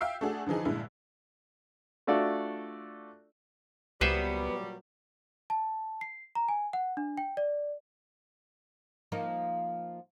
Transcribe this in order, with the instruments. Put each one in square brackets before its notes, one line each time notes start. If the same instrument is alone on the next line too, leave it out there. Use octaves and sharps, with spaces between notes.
[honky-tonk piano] E5 F5 G5 E6 C7
A3 D4 F#4 G#4
D3 E3 F3 D#4 G#4
G2 A#2 D3 G#3 E4
[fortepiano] A3 D4 F4 F#4 A4 D5
[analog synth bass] C#2 [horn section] A#2 F#3 G3 [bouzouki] B3 [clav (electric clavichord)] B4 C5 E5
[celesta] A5
C7
A#5
G#5
F#5
D4
G5
D5
[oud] F3 A#3 D#4